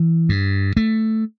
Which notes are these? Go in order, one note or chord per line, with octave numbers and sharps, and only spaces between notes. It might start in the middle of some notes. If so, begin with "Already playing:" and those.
Already playing: E3
G2
A3